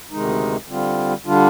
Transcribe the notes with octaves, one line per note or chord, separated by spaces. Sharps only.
D2 C3 D#3 G#3 D#4
D3 G3 C4 F4
D3 G3 D4 F4